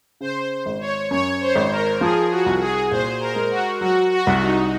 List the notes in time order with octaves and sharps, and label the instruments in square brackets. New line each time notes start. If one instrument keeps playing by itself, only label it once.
[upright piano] C#3 [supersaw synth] C5
[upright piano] G#1
[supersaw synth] C#5
[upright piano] F#2 [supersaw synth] C#5
[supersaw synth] C5
[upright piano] G#1
[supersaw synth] A#4
[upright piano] F3 [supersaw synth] G#4
[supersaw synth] F#4
[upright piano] C2
[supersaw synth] G#4
[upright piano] A#2 [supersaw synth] C5
[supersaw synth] A#4
[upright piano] G#3
[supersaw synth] F#4
[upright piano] F#3 [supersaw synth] F#4
[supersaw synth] F#4
[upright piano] C2
[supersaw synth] D#4